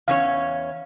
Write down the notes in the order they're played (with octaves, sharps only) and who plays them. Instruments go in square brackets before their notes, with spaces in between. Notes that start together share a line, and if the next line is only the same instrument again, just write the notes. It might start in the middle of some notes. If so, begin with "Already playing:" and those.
[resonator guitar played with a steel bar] E2 C#4 C#5 [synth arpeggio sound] F5